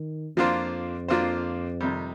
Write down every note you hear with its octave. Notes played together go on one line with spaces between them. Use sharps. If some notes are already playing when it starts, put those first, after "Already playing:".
Already playing: D#3
F2 F3 A#3 D4 F4 C5
F3 A#3 D4 F4 C5
C3 D#3 G3